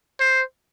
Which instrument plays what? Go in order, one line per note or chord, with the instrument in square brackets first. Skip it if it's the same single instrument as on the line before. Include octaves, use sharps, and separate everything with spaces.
[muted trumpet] C5